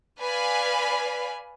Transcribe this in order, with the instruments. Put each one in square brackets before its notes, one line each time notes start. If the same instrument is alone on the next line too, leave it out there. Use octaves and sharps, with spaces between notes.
[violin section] B4 D5 F5 G#5 B5